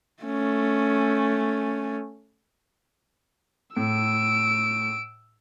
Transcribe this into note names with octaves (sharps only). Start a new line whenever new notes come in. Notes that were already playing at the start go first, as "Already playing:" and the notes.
A3 C#4
A2 E6 D7